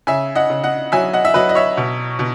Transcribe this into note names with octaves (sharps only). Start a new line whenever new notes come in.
C#3 E5 G#5
D#5 F#5
C#3
D#5 F#5
F#3 E5 G#5
D#5 F#5
E5
F#3 B4 D#5
D#5
C#5 E5
B2
B2